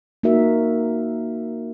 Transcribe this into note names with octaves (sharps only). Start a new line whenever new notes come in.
A#3 D#4 F#4 A#4 E5